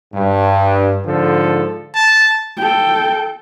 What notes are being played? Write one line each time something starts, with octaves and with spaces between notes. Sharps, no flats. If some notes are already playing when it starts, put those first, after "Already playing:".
G2
G#2 D3 F3 A4
A5
A4 G5